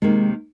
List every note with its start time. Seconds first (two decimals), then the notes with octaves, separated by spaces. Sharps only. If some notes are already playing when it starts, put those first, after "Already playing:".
0.02 C3 D#3 G#3 A#3 D#4